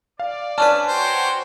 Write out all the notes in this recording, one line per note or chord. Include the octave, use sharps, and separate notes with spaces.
D5 F5
C#4 D4 B4 A5
F#4 C5 C#5 G5